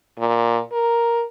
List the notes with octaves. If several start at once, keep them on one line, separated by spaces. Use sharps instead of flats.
A#2
A#4